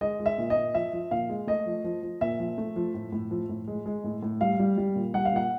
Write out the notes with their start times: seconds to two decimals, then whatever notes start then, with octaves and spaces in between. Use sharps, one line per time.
0.01 G#3 D#5
0.20 G#3
0.26 E5
0.38 A#2
0.50 D#5
0.57 A#2
0.75 F3 E5
0.93 F3
1.11 A#2 F5
1.30 G#3
1.47 A3 D#5
1.66 F3
1.84 F3
2.03 F3
2.21 A#2 E5
2.40 F3
2.58 A3
2.76 F3
2.94 A2
3.12 A2
3.31 F3
3.49 A2
3.67 G#3
3.86 G#3
4.04 A2
4.23 A2
4.41 G3 F5
4.59 G3
4.77 G3
4.96 A#2
5.14 G3 F#5
5.25 F5
5.32 A#2 F#5